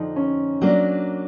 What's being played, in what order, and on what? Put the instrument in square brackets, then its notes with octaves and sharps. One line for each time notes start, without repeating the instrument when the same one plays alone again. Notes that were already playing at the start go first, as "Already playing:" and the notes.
Already playing: [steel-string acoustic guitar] F2 D3 F3 [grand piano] D#4
[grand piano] C#4
[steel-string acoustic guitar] F#3 A#3 D4